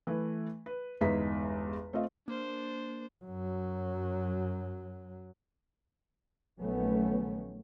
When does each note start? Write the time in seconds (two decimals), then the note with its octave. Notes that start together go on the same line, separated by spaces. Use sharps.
0.07 E3 A3 B4
0.66 B4
1.01 G1 E2 G#3 D#4 E5 B6
1.93 A3 C4 F4 D#5 F5
2.28 A#3 D4 C5
3.25 F#2 F#3
6.58 A#1 D#3 F#3 A3 B3 C#4